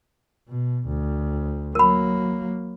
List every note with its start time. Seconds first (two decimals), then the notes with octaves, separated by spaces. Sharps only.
0.49 B2
0.87 D2
1.75 F#3 A#3 A#4 B5